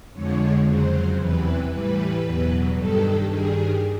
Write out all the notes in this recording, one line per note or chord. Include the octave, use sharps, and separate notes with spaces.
F2 D3 F3 G#3 C#5
F2 C#3 F#3 C5
E2 C3 E3 B4
A2 E3 G3 B4
E2 B2 F#3
G2 D#3 G3 A4
G2 D#3 G3 G#4